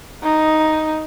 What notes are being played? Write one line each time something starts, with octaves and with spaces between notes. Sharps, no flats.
D#4